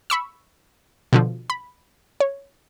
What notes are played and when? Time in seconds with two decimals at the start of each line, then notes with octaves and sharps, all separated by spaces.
0.10 B5 C#6 E6
1.13 B2 D3 F3
1.50 B5
2.20 C#5